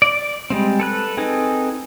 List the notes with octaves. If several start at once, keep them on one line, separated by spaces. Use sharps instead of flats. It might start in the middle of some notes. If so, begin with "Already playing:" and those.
D5
G3 G#3 C4
A4 B4 F#6
C4 D#4 G#4 A4 B4